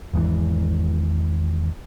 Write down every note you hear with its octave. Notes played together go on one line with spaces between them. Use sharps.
G#1 E2 G#2 E3